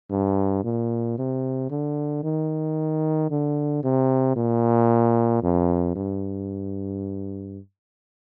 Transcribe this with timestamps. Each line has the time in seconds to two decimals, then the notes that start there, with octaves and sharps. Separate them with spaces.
0.11 G2
0.64 A#2
1.18 C3
1.71 D3
2.24 D#3
3.30 D3
3.84 C3
4.36 A#2
5.43 F2
5.96 G2